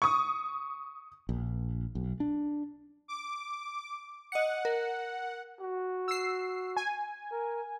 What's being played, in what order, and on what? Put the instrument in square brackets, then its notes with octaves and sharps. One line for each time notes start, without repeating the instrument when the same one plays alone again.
[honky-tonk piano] C#6 D#6
[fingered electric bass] A#1
B1
D4
[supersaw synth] D6
[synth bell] D#5 C#7 [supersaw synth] F#5
[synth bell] A#4
[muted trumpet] F#4
[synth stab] E6 C7
G#5
[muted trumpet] A#4